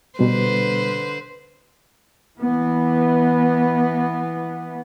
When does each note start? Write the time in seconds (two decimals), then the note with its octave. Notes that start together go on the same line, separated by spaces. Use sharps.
0.19 B2 D3 G3 B4 C5
2.39 E3 B3